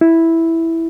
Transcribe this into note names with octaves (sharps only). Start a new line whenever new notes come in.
E4